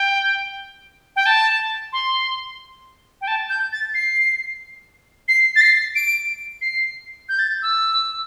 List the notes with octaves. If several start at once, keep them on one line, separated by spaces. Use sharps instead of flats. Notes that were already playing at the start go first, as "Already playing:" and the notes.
Already playing: G5
G5
A5
C6
G5
A5
G6
A6
C7
C7
A6
C7
D7
C7
G6
A6
G6
E6